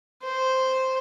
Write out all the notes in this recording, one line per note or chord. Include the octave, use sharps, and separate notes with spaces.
C5